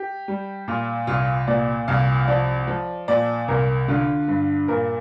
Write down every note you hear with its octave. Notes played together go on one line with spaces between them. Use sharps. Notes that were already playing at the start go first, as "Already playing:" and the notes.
Already playing: G4
G3
A#2 F4
C2 F4
A#2 D5
C2 F5
F3 D5
F3
A#2 D5
C2 A#4
D3 F4
G2
A#2 A#4